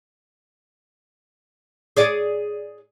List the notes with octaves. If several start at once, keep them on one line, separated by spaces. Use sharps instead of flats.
G#4 C#5 D5